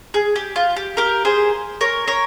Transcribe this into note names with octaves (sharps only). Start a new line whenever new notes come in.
G#4
G4
F4
G4
G4 A#4
G#4 C5
A#4 C#5
A#4 C#5